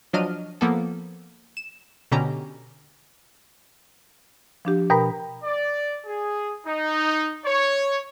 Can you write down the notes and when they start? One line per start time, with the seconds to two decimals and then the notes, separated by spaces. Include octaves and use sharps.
0.13 F3 F#3 D4 D#5 F6 D#7
0.61 F3 A#3 B3 A4
1.57 E7
2.12 B2 D3 C#4 G4 A#5
4.65 F3 D4 G4
4.90 B2 A#4 G5 A#5 B5
5.44 D5
6.06 G#4
6.67 D#4
7.46 C#5